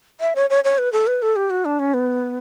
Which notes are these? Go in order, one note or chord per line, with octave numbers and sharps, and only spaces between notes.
E5
C#5
C#5
C#5
B4
A4
B4
A4
G4
F#4
D4
C#4
B3